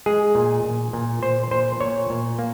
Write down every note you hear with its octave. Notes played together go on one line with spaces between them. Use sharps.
G#3 G#4
A#2
A#2
A#2
A#2 C5
A#2 C5
A#2 C#5
A#2
A#3